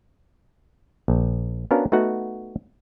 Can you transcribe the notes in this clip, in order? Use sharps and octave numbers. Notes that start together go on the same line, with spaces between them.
A#1
B3 C#4 D4 F#4 A#4 F5
A3 B3 D#4 F#4 F#5